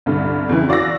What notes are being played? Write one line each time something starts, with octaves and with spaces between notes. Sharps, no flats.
C2 G2 D3
F2 C#3 E3
F#4 D5 F5 E6 A#6